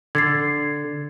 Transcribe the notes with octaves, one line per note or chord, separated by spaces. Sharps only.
D3 G#6 A6 C7